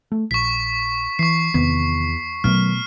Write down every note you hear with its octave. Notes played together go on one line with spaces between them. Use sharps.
A3
A#1 C#6 B6
E3 C#6 C7
E2 C3 D#3 B3
B2 D#3 F#3 A3 B3 F6